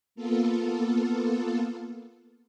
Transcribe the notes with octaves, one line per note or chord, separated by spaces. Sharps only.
A#3 B3 F4 A4